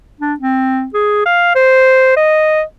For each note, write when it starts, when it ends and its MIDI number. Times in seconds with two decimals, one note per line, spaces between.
0.20 0.34 62
0.40 0.86 60
0.94 1.24 68
1.26 1.54 77
1.55 2.14 72
2.17 2.62 75